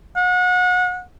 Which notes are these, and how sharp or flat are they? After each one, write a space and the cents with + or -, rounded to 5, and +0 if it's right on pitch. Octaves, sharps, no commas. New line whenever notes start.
F#5 -30